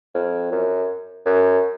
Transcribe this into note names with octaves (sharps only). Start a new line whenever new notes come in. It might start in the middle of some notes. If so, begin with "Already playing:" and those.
F2
F#2
F#2